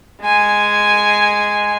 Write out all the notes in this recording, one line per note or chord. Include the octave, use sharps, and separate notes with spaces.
G#3 G#5